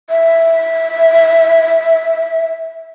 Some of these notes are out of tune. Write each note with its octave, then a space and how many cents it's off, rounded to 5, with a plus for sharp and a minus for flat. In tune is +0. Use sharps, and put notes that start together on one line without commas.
E5 -10